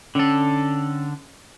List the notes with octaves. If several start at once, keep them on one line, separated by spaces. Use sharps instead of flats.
D3 C#4 A4